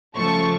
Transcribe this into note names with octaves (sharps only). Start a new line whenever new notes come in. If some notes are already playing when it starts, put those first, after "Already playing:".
C#3 F3 A3 A5 C#6